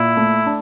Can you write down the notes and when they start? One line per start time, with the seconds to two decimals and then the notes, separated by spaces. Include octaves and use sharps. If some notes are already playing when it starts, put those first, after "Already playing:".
Already playing: A#2 E4
0.17 A3
0.46 D4